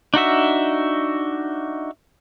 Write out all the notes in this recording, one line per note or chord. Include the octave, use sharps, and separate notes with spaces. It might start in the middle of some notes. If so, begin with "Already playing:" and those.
D4 D#4 F#4 E5